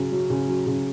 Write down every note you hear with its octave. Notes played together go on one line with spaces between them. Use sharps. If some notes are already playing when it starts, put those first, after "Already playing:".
Already playing: C#3 F#3 C#4
F#3
C#3
F#3
C#3